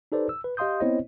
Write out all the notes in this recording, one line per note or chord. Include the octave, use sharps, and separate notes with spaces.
D#4 G4 A4 B4 C5 D5
E6
B4
G4 D#5 F5 C6 D#6 G6
B3 C4 E4 C5 C#5 D#5